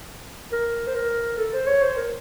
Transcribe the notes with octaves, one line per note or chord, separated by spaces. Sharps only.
A#4
C5
A#4
A4
C5
C#5
C5
A#4